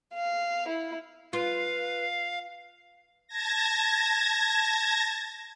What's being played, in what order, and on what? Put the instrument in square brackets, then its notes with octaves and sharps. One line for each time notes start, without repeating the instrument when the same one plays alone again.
[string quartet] F5
E4
[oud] F4 [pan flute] B4 [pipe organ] F5
[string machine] A5 G#6 A#6